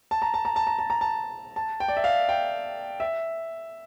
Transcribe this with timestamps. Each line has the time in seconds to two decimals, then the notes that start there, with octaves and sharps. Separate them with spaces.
0.11 A5
0.22 A#5
0.34 A5
0.45 A#5
0.56 A5
0.67 A#5
0.79 A5
0.90 A#5
1.01 A5
1.56 A5
1.80 G5
1.88 D5
1.97 E5
2.04 F5
2.29 G5
3.00 E5